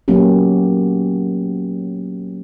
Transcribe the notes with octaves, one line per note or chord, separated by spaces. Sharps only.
F#3 A#3 B3 C#4 G4